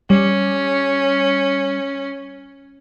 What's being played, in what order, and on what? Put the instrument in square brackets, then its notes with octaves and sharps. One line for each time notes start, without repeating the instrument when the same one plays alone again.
[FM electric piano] G3 [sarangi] C#4